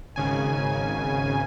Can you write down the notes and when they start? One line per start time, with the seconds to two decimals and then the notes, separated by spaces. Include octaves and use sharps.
0.16 G#1 C#3 G#5